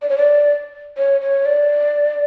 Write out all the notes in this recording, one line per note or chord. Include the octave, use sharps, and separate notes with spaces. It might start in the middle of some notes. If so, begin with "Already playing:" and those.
D5
C#5
D5
C#5
C#5
D5